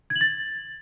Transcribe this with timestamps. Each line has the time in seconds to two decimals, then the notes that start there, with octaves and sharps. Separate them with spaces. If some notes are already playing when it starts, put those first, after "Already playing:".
0.10 G#6
0.16 F#7
0.21 A6